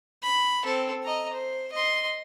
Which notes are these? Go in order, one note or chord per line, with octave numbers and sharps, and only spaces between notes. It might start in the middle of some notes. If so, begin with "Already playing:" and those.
B5
C4 A4
D#5 A#5
C5
D#5 C6